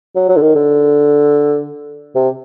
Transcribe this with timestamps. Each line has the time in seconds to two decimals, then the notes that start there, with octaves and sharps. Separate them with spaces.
0.16 F#3
0.29 F#3
0.36 D3
0.42 D#3
0.55 D3
2.15 C3